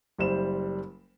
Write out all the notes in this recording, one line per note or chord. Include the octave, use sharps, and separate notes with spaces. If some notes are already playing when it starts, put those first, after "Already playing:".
F#1 G3 C5 E7